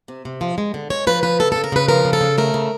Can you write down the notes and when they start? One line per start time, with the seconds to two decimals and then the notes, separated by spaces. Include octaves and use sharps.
0.08 C3
0.25 C3
0.41 F3
0.58 G#3
0.74 D3
0.90 G#3 C#5
1.07 F3 B4
1.23 F3 B4
1.40 C#3 A4
1.52 C#3 A4
1.64 A#4
1.72 C#3 B4
1.88 F3 A#4
2.05 C#3
2.13 A4
2.21 C#3
2.38 A3 A#4
2.54 C#3